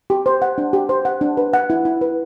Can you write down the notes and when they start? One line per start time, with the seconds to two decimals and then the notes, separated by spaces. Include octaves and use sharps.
0.10 G4
0.26 C5
0.42 F#5
0.58 D4
0.73 G4
0.89 C5
1.05 F#5
1.21 D4
1.37 B4
1.54 F#5
1.70 E4
1.85 E4
2.01 B4